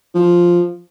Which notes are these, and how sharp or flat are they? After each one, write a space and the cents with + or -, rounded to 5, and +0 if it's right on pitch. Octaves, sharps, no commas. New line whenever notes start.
F3 +0